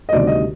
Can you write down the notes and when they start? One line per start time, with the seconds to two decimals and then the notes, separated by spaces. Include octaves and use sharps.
0.09 D#5
0.12 D2 C3 D#3 G3 D5
0.27 D#5